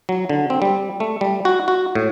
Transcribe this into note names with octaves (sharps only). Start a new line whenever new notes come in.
F#3
D3
C4
G3
A3
G3
F#4
F#4
A2